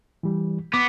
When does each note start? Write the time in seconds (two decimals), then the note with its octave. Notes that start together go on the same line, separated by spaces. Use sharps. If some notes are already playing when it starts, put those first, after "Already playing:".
0.23 E3 G3
0.74 B3 D6